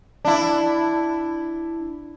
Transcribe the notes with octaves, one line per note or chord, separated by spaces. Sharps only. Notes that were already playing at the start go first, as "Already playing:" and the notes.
D4 E4